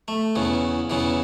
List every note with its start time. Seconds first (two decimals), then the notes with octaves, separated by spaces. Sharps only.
0.08 A3
0.35 E2 C#3 E3
0.90 E2 C#3 E3